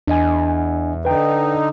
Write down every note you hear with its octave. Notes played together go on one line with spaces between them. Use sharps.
E2 D4 D#5 G#5
D3 D#4 B4 G5